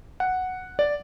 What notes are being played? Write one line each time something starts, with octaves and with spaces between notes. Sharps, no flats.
F#5
D5